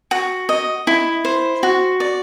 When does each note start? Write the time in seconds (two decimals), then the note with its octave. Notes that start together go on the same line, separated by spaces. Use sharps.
0.11 F#4
0.49 D#5
0.87 E4
1.25 C5
1.63 F#4
2.00 D5